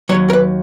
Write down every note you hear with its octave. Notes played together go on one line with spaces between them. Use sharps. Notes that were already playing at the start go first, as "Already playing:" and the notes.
D#2 D#3 F#3 C#5
A#4
B4